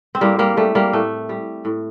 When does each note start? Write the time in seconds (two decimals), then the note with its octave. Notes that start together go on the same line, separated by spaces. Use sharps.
0.15 C4
0.21 A2 G3 A#3
0.39 G3 A#3
0.57 G3 A3
0.75 G3 A#3
0.93 A2 A3
1.29 G3
1.65 A2